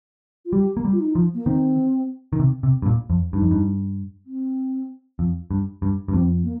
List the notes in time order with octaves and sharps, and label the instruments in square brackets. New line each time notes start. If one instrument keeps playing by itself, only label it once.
[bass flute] F4
[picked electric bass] G3 [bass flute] G4
[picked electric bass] A#3
G3
[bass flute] F4
D#4
[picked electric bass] F3
[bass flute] A#3
[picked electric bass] D#3 [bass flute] C4
[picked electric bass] D#3
C3
C3
G2
A#2
F2
[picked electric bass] G2 [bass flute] D#4
[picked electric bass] F2
G2
[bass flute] C4
[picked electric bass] F2
G2
G2
G2
[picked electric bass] F2 [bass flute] C4
[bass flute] A#3